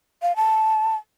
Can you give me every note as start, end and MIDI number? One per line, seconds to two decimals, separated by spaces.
0.22 0.35 77
0.36 0.95 81